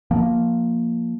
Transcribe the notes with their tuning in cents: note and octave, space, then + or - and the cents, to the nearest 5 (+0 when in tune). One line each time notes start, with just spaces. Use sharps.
F3 +0 A#3 +0